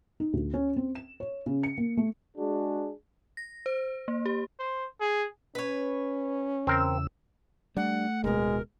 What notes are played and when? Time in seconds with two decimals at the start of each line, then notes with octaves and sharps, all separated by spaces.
0.20 D#4
0.33 D2
0.54 C#4
0.76 C4
0.95 E7
1.20 C#5
1.46 C#3
1.63 C#7
1.78 A#3
1.97 A3
2.37 G#3 D4 F#4 G#4
3.37 A#6
3.66 C5
4.08 A#3
4.26 G4
4.60 C5
5.01 G#4
5.55 C#4 B4 C#5
6.67 E2 C#3 C4 A#4 E6
7.77 G3 A3 D4 F#5
8.24 D1 B2 G#3 A#4